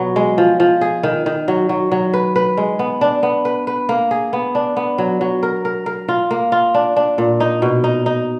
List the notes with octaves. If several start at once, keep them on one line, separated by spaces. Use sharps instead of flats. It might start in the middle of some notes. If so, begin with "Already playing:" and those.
Already playing: B2 F#3 B3
G#3
F3
F3
G#4
D#3
D#3
F#3
F#3
F#3
B4
B4
G#3
B3
D4
B3
B4
B4
A#3
G#4
B3
D4
B3
F#3
F#3
A#4
A#4
A#4
F4
A#3
F4
D4
D4
A#2
D#4
B2
D#4
D#4